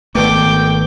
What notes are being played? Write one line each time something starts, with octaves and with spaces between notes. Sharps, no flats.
G#1 B2 D3 A3 G5 D6